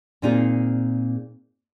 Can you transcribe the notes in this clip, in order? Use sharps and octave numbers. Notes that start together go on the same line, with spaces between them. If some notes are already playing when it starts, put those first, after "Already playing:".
A#2 C4 D#4 F4 G#4